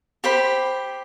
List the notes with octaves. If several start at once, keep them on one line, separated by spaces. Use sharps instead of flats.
G4 C5 B5